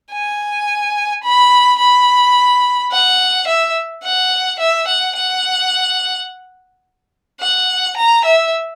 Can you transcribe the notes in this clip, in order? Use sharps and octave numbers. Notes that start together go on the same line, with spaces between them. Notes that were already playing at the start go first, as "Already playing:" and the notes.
G#5
B5
B5
F#5
E5
F#5
E5
F#5
F#5
F#5
A#5
E5